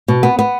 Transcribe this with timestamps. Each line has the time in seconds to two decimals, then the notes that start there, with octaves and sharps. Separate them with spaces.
0.08 B2
0.23 B3
0.39 B3